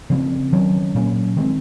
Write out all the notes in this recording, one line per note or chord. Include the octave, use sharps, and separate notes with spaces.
C#3 F3 C4
D#3 F#3 C#4
A#2 F#3 A#3 C#4
D#3 G#3 C4